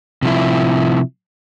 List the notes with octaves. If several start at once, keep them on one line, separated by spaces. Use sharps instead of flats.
C3 F3 E4